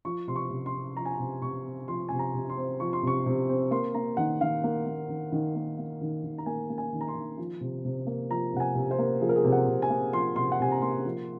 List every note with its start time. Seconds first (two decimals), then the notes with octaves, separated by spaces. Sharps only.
0.05 F3 C#6
0.27 C3 C6
0.36 C#6
0.50 C3
0.66 C6
0.74 C4
0.97 F3 A#5
1.05 G#5
1.14 A#5
1.19 C3
1.42 C3 C#6
1.66 C4
1.88 F3 C6
2.09 C3 G#5
2.19 A#5
2.34 C3
2.49 C6
2.57 C4
2.80 F3 C#6
2.93 C6
3.03 C3 C#6
3.26 C3
3.49 C4
3.71 A#3 C6
3.94 A#3 A#5
4.17 D#3 F#5
4.41 D#3 F5
4.64 A#3
4.86 A#3
5.09 D#3
5.32 D#3
5.56 A#3
5.78 A#3
6.01 D#3
6.23 D#3
6.38 A#5
6.46 A#3 G#5
6.70 A#3
6.78 G#5
6.93 D#3
7.01 A#5
7.08 C6
7.15 D#3
7.38 F3
7.61 C3
7.85 C3
8.07 A#3
8.30 F3 A#5
8.54 C3 F#5
8.60 G#5
8.75 C3
8.91 C5
8.99 A#3
9.21 F3 G#4
9.29 A#4
9.36 G#4
9.44 C3
9.52 F#5
9.68 C3
9.82 G#5
9.90 A#3
10.13 F3 C6
10.36 C3 C6
10.52 F#5
10.60 C3 G#5
10.72 A#5
10.82 A#3 C6
11.05 F3